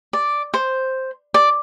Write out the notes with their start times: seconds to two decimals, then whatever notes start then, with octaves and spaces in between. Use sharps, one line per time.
0.13 D5
0.54 C5
1.34 D5